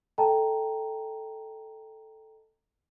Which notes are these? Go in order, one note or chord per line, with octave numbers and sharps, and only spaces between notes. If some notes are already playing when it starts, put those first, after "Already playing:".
A4 D#5 G5 A5 A#5